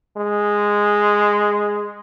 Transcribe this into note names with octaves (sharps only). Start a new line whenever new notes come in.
G#3